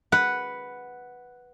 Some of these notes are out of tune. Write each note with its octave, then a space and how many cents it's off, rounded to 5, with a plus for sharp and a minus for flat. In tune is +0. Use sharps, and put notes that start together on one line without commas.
B4 +0 F#5 +0